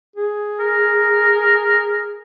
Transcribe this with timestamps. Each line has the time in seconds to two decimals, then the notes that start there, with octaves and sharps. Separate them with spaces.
0.16 G#4
0.60 A#4